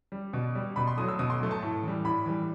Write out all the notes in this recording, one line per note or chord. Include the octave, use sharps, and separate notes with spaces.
G3
B2
G3
B2 B5
C6
F#3 A3 D#6
E6
B2 D#6
C6
F#3 A3
A5
A2
E3 G3
A2 B5
E3 G3